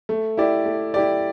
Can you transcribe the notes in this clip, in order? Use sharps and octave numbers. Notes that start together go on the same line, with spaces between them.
A3
E4 G4 D5
A3
E4 G4 D5